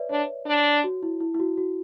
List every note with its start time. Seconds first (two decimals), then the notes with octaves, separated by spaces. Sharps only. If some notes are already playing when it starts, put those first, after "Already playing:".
Already playing: B4 C#5 D5 E5
0.10 D4 C#5
0.46 D4
0.84 F#4
1.03 E4
1.20 E4
1.34 E4
1.40 F#4
1.57 F#4